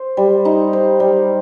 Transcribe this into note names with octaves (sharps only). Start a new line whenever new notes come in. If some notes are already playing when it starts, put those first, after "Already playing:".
Already playing: C5
G3
D#4
C5
G3